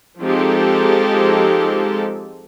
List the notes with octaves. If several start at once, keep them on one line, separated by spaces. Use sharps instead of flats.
F3 G#3 C4 D#4 G4 A4